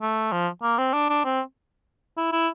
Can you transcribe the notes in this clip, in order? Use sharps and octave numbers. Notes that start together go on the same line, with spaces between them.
A3
F3
A#3
C4
D4
D4
C4
E4
E4